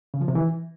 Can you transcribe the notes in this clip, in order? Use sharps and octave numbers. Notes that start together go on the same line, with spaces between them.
C#3
F3
C3
E3